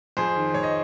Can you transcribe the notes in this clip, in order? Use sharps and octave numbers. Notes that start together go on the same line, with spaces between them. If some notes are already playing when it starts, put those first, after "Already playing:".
F2 G#4 C5
D#3
F2 C#5
D#5